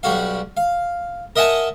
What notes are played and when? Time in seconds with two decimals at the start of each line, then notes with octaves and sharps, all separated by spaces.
0.03 B1 G3 F#4 F5
0.57 F5
1.36 A#4 D#5 E5 F#5 G#5 A5